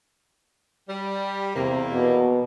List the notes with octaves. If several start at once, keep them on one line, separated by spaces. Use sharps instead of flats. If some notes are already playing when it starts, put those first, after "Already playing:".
G3
E2 C3 A#3
B2